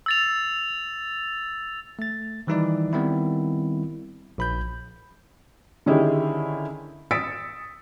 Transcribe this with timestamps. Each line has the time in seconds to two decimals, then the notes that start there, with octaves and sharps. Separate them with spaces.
0.06 E6 A6 F7
1.99 A3 A6
2.47 D#3 E3 G3 D#4 E4 D5
2.93 D#3 G3 B3 C4 E4
4.38 A#1 B5 G6
5.86 D3 D#3 C#4 E4 G4 G#4
7.11 D#6 E6 A6 B6 C#7 D7